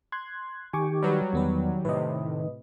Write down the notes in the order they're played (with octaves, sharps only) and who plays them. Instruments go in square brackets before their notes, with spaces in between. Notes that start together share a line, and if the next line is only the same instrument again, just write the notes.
[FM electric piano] C6 F#6 G#6
[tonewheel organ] D#3 G4 [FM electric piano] G#5 C#6 D6
[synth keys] F#3 G3 [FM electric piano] B4 D5
[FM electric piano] E2 B3 B4 [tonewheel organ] D#3
[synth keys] A2 C3 [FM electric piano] B4 D#5